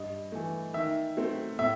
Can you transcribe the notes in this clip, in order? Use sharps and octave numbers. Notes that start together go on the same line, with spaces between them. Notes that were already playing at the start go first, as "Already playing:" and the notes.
Already playing: G2 D#5
E3 A3
D#3 E5
F#3 A3 C4
A2 E5